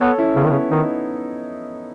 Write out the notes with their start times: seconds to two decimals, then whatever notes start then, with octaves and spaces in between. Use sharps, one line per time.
0.01 B3 A4 C#5
0.18 C#4 E4
0.36 C#3 B3
0.44 D#3
0.51 C#3 C#4
0.71 D#3 B3 D#4